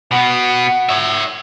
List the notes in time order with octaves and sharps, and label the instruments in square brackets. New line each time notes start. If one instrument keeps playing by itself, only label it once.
[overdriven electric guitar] B2 B3 [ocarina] F#5
[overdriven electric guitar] C#5 E5